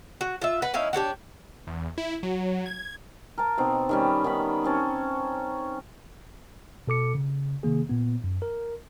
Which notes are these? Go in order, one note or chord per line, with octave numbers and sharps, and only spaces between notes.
F#4
F4 E5
B4 F#5
C#4 D#4 E4 F5
D4 G4 C#5 F#5
E2
E4
F#3
G#6
A#4 A5
B2 C4 D#4
D#3 G3 C#4
D#3 B3 B5
C4 C#4 A5
B2 A4 D6 C#7
C#3
C3 D#3 A#3 G#4
A#2 B3
F#2
A#4